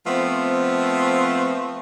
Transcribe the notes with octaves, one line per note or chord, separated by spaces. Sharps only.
F3 A3 B3 C4